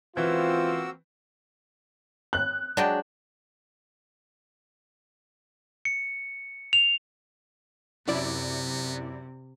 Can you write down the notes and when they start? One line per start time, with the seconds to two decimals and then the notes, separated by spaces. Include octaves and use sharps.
0.17 C#2 E3 F3 A#3 C4 F4 F#4 E6
2.33 F#6
2.77 F#3 G#3 D4 D5 G5
5.85 C#7
6.73 F7
8.08 F#2 C3 B3 E4 D5